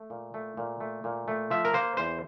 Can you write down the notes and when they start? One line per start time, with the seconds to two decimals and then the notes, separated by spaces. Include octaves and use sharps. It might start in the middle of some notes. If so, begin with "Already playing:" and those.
Already playing: A3
0.10 A#2
0.34 A3
0.57 A#2
0.80 A3
1.04 A#2
1.28 A3
1.50 F3 E5
1.65 A#4
1.74 A#3 C5
1.97 E2 C5